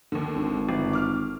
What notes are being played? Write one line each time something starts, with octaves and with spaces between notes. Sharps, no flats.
D#2 D3
G#1
G1
D6 F6